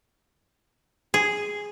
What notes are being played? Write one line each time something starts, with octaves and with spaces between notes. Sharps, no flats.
G#4